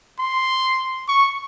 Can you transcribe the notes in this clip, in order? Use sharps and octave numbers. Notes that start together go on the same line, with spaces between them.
C6
C#6